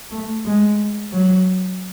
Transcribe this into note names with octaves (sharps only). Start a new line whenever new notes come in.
A3
G#3
F#3